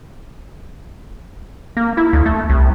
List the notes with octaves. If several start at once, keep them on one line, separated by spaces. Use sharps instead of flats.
A#3
E4
D2
A3
C2